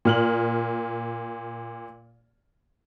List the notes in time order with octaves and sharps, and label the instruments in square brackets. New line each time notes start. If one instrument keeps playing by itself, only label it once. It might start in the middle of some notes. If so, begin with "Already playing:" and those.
[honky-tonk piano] A#2 F6 F#7